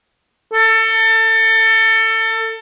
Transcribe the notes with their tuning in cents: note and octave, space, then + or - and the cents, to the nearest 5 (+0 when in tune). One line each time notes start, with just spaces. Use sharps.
A4 +25